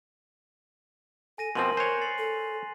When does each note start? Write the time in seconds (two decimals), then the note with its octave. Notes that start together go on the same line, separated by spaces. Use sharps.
1.38 A4 G#5 A#6 D#7
1.55 B2 F3 C4 A#4 C6 D#7 F#7
1.77 C5 C#5 G#5 F#6 F7
2.01 A6 C7 F#7
2.18 A4